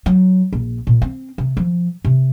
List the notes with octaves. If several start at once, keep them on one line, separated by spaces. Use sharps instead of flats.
F#3
A#1
A#2
C4
C3
F3
C3